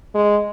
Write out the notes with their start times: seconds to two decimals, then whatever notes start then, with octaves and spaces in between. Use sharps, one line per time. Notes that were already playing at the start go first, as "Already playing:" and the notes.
0.14 G#3